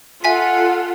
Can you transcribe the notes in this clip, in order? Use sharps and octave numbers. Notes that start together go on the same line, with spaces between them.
F4 A4 E5 F#5 G#5 B6